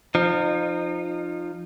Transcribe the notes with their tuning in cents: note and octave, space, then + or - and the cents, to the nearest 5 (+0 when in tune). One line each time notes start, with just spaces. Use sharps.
F3 +0 D#4 -35